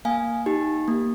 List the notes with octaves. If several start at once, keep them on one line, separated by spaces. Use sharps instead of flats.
A#3 F5 G#5
D#4 G4
A#3